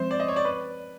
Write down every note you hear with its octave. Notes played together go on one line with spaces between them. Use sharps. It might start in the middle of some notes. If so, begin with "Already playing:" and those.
Already playing: F3 G#3 C4 C5
D5
D#5
C#5
D5
B4